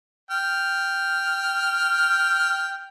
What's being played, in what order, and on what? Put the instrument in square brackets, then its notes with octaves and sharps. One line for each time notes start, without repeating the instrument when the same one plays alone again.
[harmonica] G5 F6